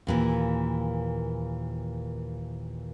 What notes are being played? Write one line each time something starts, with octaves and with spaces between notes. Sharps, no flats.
D#2 A#2 E3